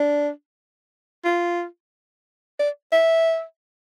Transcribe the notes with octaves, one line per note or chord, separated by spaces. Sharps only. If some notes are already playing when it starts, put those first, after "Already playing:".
Already playing: D4
F4
D5
E5